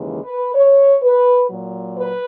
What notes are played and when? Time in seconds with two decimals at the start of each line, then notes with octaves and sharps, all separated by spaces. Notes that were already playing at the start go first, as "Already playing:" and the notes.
Already playing: D#2 C#3 E3 G#3
0.24 B4
0.55 C#5
1.03 B4
1.49 A#2 F#3
1.96 B4